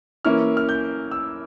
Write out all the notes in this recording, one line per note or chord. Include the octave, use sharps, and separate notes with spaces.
E3 A#3 C#4 E4 F6
F6
G6
E6